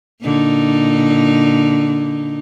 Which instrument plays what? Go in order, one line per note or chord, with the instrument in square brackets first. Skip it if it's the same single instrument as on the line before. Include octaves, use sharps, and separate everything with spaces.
[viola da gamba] A#2 D3 D#4